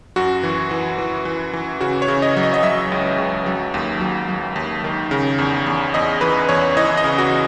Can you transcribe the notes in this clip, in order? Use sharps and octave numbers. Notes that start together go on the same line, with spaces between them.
F#2 F#4
E3
E3
E3
E3
E3
C#3 F#4
C#5
C#3
D#5
F#3
D#5
D#5
F#3 E5
C#2
C#2
F#3
D#2
F#3
F#3
D#2
D#3
C#3
E2
E2
E2 D#5
E3 B4
E2 C#5
E3 D#5
D#5
C#3
F#4